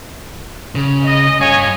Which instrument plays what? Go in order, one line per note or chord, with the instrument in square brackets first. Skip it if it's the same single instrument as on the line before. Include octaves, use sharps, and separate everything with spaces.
[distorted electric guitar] C#3
[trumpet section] D#5
[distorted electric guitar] G2 F5 [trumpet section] G#4 C#5 G#5